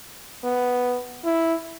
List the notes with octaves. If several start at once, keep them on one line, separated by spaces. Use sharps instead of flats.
B3
E4